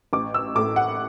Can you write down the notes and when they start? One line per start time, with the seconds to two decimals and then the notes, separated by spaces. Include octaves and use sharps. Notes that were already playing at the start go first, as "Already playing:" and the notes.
0.13 A1 D6
0.34 E6
0.55 A2 D6
0.59 A3
0.76 F#5